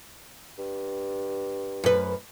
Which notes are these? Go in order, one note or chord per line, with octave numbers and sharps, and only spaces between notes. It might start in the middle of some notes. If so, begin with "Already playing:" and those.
G2
F#2 B4